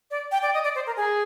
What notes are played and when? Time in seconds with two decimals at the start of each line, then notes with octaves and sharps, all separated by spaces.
0.11 D5
0.31 G5
0.42 D5
0.54 D#5
0.64 D5
0.75 C5
0.86 A#4
0.96 G#4